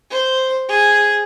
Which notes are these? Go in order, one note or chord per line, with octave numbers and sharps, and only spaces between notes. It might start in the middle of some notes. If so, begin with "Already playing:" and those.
C5
G#4